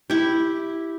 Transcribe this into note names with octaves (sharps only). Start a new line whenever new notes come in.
E4 G4